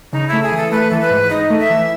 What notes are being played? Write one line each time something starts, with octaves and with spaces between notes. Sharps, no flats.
C#3 D#4
A3 E4
G#4
E3
A4
A3 B4
E3 A4
B4
G#2
D#4 D#5
A3
E5
E3